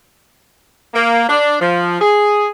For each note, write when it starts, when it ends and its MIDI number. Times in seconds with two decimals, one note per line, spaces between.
0.94 1.24 58
1.28 1.56 62
1.61 2.01 53
2.01 2.47 68